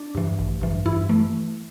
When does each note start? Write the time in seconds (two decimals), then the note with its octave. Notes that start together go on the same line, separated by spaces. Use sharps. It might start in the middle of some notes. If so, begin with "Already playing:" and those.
Already playing: D4
0.15 G2 E3
0.39 A1
0.61 G2 E3
0.86 G2 E4
1.09 E3 A3